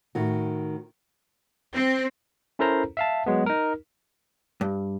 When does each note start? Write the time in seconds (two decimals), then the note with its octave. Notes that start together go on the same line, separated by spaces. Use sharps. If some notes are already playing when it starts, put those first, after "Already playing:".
0.15 A2 D#3 F#4
1.74 C4
2.59 C#4 E4 A4 A#4 C5 A#5
2.97 E5 F5 A5
3.26 F#3 G#3 B3
3.46 D#4 A#4
4.61 G2